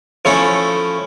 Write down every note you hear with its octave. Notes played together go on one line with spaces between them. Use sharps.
F3 A3 C#4 E4 A4